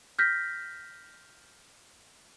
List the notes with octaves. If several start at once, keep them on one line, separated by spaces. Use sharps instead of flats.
F6 G6 A#6 B6